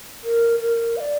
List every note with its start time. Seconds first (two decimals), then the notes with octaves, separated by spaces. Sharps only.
0.24 A#4
0.60 A#4
0.97 F5
1.00 D5